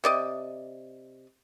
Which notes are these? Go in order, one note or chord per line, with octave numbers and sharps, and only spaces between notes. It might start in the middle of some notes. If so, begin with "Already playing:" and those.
C3 D5 D#5